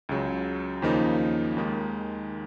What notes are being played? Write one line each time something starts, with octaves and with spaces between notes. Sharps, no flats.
C#2 C#3 F#3
D#2 C#3 F3 A#3 D#4
D#2 D#3 G#3